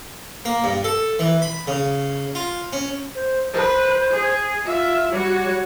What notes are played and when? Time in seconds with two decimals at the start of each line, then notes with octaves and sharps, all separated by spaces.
0.45 A#3
0.64 G2
0.84 A4
1.19 E3
1.42 B5
1.67 C#3
2.35 F4
2.73 C#4
3.15 C5
3.53 B4 C5
4.10 G#4
4.66 F4 E5
5.11 G3 F#4 C#5